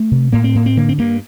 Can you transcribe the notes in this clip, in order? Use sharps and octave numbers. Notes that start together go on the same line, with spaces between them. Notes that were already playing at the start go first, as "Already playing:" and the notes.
Already playing: A3
C3
A2 A#3
C4
A2 A#3
C4
D3 A#3
C4
G2 A#3